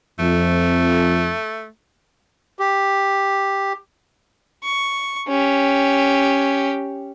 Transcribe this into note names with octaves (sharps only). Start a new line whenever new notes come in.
F2 A3
G4
C#6
C#4 G4